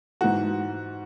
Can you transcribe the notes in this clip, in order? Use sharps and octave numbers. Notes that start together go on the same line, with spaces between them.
G#2 E3 F#4